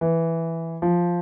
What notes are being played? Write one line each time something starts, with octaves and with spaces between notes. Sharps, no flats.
E3
F3